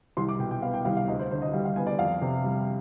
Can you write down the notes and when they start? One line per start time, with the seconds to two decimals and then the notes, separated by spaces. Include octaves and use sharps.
0.17 C2 C6
0.29 D6
0.39 B2 G5
0.51 G5
0.62 B3 F5
0.74 G5
0.85 C2 F5
0.97 F5
1.08 D2 D#5
1.19 C5
1.31 D3 C5
1.42 D#5
1.53 G3 F5
1.65 F5
1.76 B3 G#5
1.87 D5
1.99 F2 F5
2.22 C3
2.44 G3